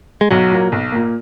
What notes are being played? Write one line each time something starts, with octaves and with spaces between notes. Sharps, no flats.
G#3
B1 F#3
A#2 A#3
B1
A#2 A#3